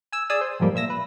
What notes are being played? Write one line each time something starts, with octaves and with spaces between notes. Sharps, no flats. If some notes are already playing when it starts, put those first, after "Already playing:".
G#5 E6
G#4 D5 G#5 D#6 E6
C5
F2 G#2 F3 G3 A#3
A#2 E5 E6 A#6
B4